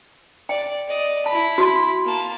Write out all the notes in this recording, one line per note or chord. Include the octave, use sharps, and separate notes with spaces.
D5 G5
D5 D#5
E4 A5 B5
F#4 C6
A#3 A5